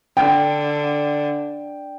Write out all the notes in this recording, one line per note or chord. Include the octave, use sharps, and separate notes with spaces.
D3 G5